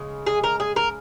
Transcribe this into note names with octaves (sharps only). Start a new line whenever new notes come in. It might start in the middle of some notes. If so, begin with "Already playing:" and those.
Already playing: C#3 G#3
G#4
A#4
G#4
A#4